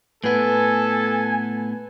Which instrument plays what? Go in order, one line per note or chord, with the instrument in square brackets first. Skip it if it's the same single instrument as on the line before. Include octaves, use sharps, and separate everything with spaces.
[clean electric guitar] A2 B3 [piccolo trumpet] A4 [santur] B4 C6 [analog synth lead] G#5